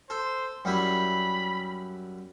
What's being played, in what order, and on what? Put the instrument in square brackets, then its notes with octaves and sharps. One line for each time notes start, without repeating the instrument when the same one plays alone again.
[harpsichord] A4 [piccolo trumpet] C5
[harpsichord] F#2 G3 E4 [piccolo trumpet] B5